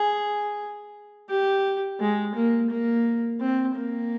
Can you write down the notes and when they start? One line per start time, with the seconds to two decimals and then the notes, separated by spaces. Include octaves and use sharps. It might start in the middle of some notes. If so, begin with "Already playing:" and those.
Already playing: G#4
1.30 G4
2.00 G#3
2.35 A#3
2.70 A#3
3.40 C4
3.75 A#3